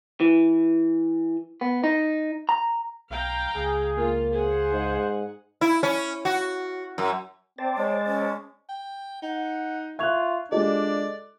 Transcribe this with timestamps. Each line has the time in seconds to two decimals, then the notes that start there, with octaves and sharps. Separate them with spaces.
0.20 E3
1.61 B3
1.84 D#4
2.49 A#5
3.10 B1 F5 G5 A#5
3.56 C#2 G#4
3.98 A#3 F4
4.34 G#4 C5 F5 F#5 G#5
4.72 G#2
5.61 E4
5.83 C#4
6.25 F#4
6.98 F#2
7.58 C4 C5 D5 A5
7.78 G#3 C#5
8.06 C#4
8.69 G5
9.22 D#4 F#5
9.99 F4 E5 C#6 F#6 G#6 F7
10.52 G#3 D4 F4 G4 A4 D5 D#5